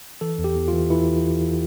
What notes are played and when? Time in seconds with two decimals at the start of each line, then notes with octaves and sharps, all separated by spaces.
0.21 E3 A4
0.38 E2
0.44 G4
0.56 E2
0.68 F4
0.73 E3
0.90 E3 E4